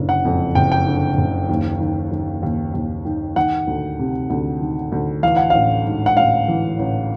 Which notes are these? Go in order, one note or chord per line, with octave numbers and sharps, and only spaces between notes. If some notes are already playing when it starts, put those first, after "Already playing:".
Already playing: F#1 D3
F#5
F2
F#1 G5
G5
D3
F#1
D#2
D#3
D#3
D#2
D#2
D#3
D#3 F#5
D2
C3
D2
D#3
D2
E3 F5
F#5
A1 F5
G#2
F#5
A1 F5
E3
A1